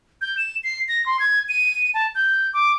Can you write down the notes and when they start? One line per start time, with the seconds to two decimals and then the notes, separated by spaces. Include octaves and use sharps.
0.21 G6
0.38 E7
0.64 C7
0.88 A#6
1.06 C6
1.20 G#6
1.49 D#7
1.94 A5
2.15 G6
2.54 D6